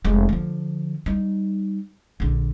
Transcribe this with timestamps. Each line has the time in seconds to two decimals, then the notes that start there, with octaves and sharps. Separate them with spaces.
0.05 F1 G#3
0.29 D3 F3
1.06 G3 D#4
2.20 A#1 D3